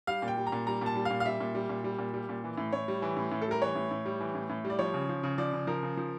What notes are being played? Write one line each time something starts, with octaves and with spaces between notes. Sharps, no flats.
G3 F5
A#2
G5
G3
A#5
A#2
G3 A#5
A#2 A5
G3
F5
A#2
F5
G3 E5
A#2
G3
A#2
G3
A#2
G3
A#2
E3
A2
A2 C#5
G3
E3
A2
A2
A4
G3 A#4
E3 C#5
A2
A2
G3
E3
A2
A2
G3
D5
F3 C#5
C#3
F3
C#3
F3 D5
C#3
F3 A#4
C#3
F3